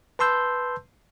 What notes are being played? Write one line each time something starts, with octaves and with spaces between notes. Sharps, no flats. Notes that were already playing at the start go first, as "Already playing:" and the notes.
B4 A5 C6 E6 G6